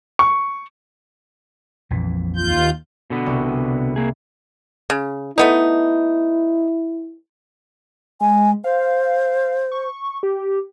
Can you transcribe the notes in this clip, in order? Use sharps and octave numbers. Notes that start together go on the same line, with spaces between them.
C#6
A#1 F2 E3
D#2 F4 G6
B2 D3 B3
C2
A#3 G#4
C#3
A3 B3 D#4 E4
G#3 G#5
C5 F5
C#6
G4